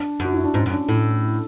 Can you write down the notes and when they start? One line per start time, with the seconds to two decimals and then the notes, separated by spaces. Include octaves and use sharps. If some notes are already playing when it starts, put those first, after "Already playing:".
Already playing: D4
0.20 F#2 F#4
0.34 E4
0.44 D4
0.54 G#2 C#4
0.66 F#2
0.71 D4
0.89 A2 E4